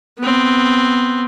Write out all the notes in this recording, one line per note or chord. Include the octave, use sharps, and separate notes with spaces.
B3 C4